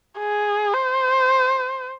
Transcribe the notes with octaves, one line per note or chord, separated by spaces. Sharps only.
G#4
C5